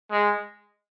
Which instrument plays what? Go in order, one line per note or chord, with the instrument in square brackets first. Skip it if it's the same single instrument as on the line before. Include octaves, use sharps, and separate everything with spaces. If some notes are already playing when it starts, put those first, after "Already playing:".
[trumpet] G#3